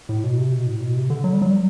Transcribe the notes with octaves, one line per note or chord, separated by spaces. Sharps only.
A2
B2
C3
B2
A2
B2
C3
D3
F#3
G3
F#3
G3